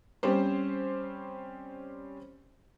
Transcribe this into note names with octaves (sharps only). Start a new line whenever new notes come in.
G3 C4 C#4 G4 C5